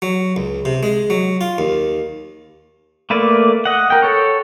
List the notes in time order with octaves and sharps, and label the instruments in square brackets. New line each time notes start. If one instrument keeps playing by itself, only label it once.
[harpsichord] F#3
C#2
C3
G#3
F#3
F4
D#2
[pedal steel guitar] A3 A#3 B4 D5
D#5 F#5
A#4 G5
A4 C#5